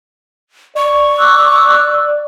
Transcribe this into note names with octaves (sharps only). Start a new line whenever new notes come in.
D5 C#6
D6 E6 F#6